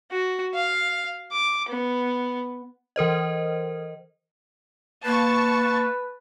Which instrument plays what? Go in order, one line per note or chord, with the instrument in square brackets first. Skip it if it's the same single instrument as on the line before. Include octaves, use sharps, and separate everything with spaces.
[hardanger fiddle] F#4
F5
D6
B3
[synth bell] E3 A#4 C5 D#5
[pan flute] A#3 [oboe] B4 [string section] A5 C#6 A6